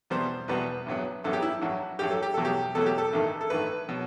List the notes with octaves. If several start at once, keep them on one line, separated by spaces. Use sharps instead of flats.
E2 B2 G3 B3 C5
E2 B2 G3 B3 B4
A1 G2 F#3 B3
A1 G2 F#3 B3 A4
G4
E4
A1 G2 F#3 F#4
A1 G2 F#3 G4
A4
G4
E2 B2 F#3 A3 A4
G4
E2 B2 F#3 A3 A4
G4
A4
A1 G2 D#3 A3
A4
A1 G2 D#3 A3 B4
B2 F#3